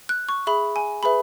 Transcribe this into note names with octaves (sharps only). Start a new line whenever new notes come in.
F#6
C#6
G#4 E5 B5
G#5
G#4 B4 E5 B5